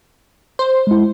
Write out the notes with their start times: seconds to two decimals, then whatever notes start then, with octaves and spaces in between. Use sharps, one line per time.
0.59 C5
0.87 G#3 E4